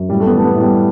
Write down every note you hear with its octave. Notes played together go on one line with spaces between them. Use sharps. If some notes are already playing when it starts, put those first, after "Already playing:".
Already playing: F#2
A2 G3
A3
B3
E3
A3
B3
A2
G3